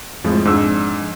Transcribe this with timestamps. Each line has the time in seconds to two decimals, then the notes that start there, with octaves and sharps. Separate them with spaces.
0.24 F2 A2 F3 G#3
0.45 F2 G#2 D4 E6